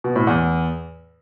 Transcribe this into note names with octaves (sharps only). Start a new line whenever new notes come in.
B2
A2
E2